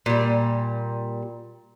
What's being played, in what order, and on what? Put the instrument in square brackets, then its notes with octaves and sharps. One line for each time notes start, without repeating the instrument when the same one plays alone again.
[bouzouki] A#2 G3